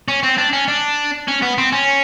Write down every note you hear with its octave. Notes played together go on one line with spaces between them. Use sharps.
C#4
C4
D4
C#4
D4
C#4
B3
C4
C#4